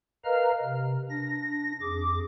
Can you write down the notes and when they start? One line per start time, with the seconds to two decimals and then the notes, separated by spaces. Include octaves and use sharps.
0.25 A#4 B4 D#5 F5 A#5 F6
0.63 C3
1.10 D4 A#6
1.81 F2 G#4 D6